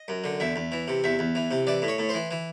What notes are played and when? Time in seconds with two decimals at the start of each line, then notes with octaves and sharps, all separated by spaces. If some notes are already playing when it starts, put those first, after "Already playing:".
Already playing: D#5
0.08 F#2
0.24 D3
0.40 E2 E5
0.56 E2
0.72 E3
0.88 C3
1.04 E2 E5
1.19 E2
1.35 E3
1.51 C3
1.67 E3 D5
1.82 A2
1.88 C#5
1.98 A2
2.09 C5
2.14 E3
2.31 E3